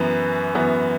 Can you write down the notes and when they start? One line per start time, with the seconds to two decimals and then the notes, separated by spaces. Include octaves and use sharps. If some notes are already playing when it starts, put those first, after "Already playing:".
Already playing: F#2 E3 B3
0.55 F#2 E3 B3